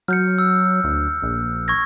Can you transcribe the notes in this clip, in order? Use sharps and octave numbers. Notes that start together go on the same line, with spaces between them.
F#3 F6 G6 C#7
E6
D2
A#1
C#6 G#6 A#6